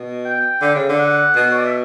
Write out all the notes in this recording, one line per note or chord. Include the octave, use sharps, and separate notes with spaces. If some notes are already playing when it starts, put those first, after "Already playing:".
Already playing: B2
G5
D3
C#3
D3
F#5
B2
C#5
D5
E5